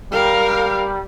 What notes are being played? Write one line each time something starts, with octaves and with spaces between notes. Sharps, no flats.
G3 A#4 F5